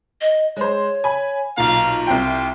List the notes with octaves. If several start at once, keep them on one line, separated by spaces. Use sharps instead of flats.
D#5
G#3 C5 C#5
G#5 B5
B1 A#2 F5 A#5
C2 C4 F4 G5